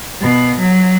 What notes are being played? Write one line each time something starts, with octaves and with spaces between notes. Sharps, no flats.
B2
F#3